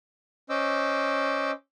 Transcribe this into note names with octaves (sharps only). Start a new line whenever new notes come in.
C#4 C5 D#5 D6 E6